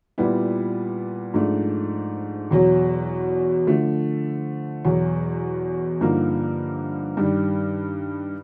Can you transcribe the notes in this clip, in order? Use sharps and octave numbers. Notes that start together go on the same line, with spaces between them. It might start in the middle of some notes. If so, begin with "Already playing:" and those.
A#2 G3 B3 E4
G#2 F3 A3 D4
E2 B2 F#3
D3 F3 A3
E2 B2 F#3
G2 D3 F3 A#3 D#4
G2 D#3 G3